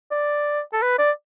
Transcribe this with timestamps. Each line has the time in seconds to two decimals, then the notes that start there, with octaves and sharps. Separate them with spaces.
0.11 D5
0.73 A4
0.82 B4
0.99 D5